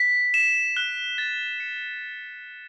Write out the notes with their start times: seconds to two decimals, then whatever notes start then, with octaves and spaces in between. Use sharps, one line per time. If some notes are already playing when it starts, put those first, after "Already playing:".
Already playing: B6
0.34 E7
0.77 F#6
1.18 A6
1.60 C#7